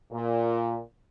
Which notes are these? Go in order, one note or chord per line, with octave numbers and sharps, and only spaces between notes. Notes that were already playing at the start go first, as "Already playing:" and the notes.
A#2